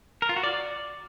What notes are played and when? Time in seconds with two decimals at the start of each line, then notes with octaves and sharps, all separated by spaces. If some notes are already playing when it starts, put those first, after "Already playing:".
0.22 A#4
0.29 F4
0.36 F#4
0.44 D5